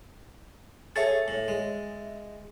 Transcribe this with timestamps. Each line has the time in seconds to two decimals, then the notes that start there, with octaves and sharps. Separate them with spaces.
0.96 G#4 A4 C#5 E5 A6
1.28 A2
1.48 G#3